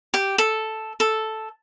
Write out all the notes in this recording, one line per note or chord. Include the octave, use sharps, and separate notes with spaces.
G4
A4
A4